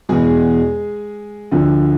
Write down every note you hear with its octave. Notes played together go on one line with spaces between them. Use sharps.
E2 B2 G#3 G#4
D2 D3 F3